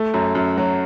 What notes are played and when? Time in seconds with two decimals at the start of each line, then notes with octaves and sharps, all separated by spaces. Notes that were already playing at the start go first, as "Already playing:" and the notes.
Already playing: A3
0.14 F#2
0.35 F#2
0.58 F#3